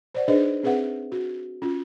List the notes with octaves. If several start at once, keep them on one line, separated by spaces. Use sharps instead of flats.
C5 D5 F#5
D4 D#4 G#4 B4 C5 D#5
C4 G#4 B4 E5 F#5
F#4
C#4 F4